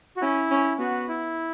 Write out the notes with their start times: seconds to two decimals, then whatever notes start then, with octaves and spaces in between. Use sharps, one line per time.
0.17 F#4
0.21 C#4 E4
0.51 C#4
0.79 B3 F#4
1.08 E4